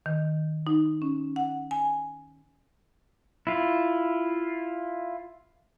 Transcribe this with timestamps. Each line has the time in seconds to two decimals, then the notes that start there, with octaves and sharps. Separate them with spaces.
0.06 D#3
0.67 D#4
1.02 C#4
1.36 F#5
1.71 G#5
3.47 E4 F4